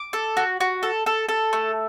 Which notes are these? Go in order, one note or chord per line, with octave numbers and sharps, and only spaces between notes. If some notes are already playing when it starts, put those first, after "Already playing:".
Already playing: D6
A4
F#4
F#4
A4
A4
A4
A3